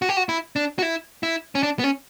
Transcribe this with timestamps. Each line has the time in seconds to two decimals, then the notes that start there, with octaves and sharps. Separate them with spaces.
0.02 F#4
0.09 G4
0.17 F#4
0.29 E4
0.56 D4
0.79 F#4
0.83 E4
1.23 E4
1.55 C#4
1.63 D4
1.79 B3
1.84 C#4